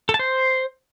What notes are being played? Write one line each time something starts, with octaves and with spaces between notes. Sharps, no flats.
A4
A5
C5